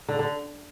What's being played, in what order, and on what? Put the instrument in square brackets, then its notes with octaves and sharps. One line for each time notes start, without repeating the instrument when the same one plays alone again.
[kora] D3
D3